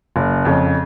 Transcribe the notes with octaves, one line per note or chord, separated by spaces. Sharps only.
F#1
F2 C#3